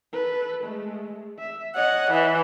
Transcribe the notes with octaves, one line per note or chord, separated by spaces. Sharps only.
A4 B4
G#3 A3
E5
C#5 D#5 F#5
E3